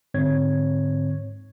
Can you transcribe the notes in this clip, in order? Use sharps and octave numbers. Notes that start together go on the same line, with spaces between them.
G#2 D3 C4 C#5 G#6